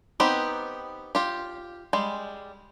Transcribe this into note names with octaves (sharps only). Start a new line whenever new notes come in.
B3 C4 D#4 G4 B4
F4 G4
G3 G#3